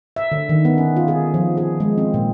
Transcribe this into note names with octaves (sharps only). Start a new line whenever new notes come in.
E5
D3
D#3
B3
C#4
F4
G#4
F3
G#4
G#3
C4
A#2